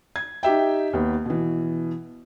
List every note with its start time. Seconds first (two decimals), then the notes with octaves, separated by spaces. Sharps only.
0.16 G#6
0.43 D#4 G4 E5 G5
0.93 D#2 B3
1.26 B2 E3